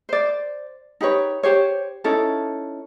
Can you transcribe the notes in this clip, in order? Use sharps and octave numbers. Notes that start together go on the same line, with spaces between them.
C5 D5
D#4 G4 B4 C#5
G4 C5 C#5
C#4 D#4 E4 A4